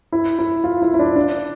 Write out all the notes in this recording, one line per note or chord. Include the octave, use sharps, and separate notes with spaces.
E4
E4
F4
E4
E4
D4
D4